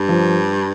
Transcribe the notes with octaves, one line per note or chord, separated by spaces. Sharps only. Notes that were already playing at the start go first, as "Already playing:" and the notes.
Already playing: G2
F3